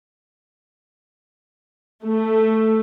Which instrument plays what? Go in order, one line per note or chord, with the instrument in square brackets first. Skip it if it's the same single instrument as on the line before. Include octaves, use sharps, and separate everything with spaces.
[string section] A3